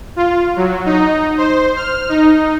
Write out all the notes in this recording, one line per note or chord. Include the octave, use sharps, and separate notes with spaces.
F4
F#3
D#4
C5
F6
D#4